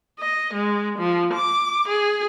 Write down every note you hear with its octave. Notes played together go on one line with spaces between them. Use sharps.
D#5
G#3
F3
D6
G#4